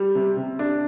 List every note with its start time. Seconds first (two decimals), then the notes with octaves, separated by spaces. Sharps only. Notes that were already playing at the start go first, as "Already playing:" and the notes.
Already playing: G3
0.15 C3
0.37 C3
0.59 D4